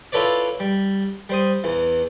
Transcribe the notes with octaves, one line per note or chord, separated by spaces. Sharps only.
E4 F4 A4 B4 C#5 D5
G3
G3 C5 D#6
E2 E3